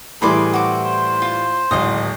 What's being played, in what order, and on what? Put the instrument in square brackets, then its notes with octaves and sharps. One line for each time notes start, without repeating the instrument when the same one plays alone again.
[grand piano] A2 E3 G3 [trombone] G#4 [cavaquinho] B5 C6 D6
[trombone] C4 [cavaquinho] F#4 D6
[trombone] C5
[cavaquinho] F4
[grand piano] D1 G#1 [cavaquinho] D#5 F5